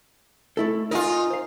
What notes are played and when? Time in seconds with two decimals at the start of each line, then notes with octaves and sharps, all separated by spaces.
0.57 A3 E4 A4
0.91 D#4 F4 A#4 G#5
1.30 C5 F5